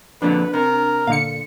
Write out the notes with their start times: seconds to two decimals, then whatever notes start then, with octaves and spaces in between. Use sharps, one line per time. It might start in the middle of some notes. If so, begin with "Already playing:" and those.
0.22 F2 A#2 D3 D4 B4
0.54 C3 A#4
1.07 A#2 D3 F5 C#7